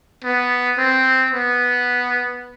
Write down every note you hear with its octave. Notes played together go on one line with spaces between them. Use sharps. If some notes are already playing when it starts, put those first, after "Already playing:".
B3
C4
B3